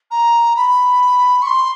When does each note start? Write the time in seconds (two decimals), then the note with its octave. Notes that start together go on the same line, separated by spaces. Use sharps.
0.11 A#5
0.56 B5
1.42 C#6
1.47 C6